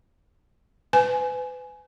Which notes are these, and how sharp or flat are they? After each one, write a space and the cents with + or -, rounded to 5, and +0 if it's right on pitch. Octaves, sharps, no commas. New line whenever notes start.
B4 +30 G#5 +10